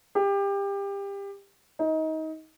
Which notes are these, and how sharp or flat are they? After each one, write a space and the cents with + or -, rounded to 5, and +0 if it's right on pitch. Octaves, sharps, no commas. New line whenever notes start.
G4 +25
D#4 +25